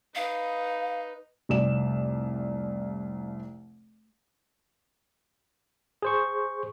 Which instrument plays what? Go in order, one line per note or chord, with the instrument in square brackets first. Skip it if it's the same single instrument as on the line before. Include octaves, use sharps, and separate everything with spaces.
[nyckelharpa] D#4 B4 [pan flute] F5
[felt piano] F1 C2 D5 E7
[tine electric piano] G#4 C5 C#6